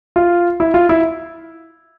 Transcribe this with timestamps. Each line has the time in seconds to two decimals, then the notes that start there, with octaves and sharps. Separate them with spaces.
0.16 F4
0.60 E4
0.74 F4
0.89 E4